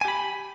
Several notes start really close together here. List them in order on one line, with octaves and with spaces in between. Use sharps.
G#5 G4 B5